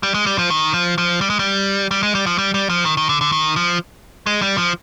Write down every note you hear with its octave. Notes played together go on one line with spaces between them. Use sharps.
G3
G#3
G3
F3
D#3
F3
F3
G3
G#3
G3
G3
G#3
G3
F3
G3
G3
F3
D#3
D#3
D3
D3
D#3
F3
G#3
G3
F3